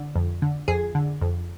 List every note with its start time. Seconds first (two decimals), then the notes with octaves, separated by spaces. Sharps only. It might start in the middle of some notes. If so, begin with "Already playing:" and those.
Already playing: D3
0.16 F2
0.42 D3
0.68 F2 G#4
0.95 D3
1.21 F2